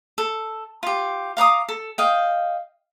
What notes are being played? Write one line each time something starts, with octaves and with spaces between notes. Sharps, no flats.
A4
F4 G4
F5 A#5 D6 D#6
A4
D#5 F5 G5